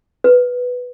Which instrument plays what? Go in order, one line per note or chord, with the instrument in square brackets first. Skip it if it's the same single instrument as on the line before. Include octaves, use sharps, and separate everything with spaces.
[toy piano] B4